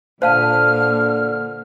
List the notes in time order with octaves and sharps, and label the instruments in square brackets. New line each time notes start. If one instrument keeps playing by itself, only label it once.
[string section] A#2 [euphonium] D3 [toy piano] C5 F5 A5 [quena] F6